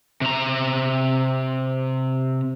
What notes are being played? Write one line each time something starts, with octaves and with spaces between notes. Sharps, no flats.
C3 A#5